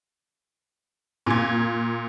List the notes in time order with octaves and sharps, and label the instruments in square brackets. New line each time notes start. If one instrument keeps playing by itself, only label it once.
[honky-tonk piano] A#2 G#6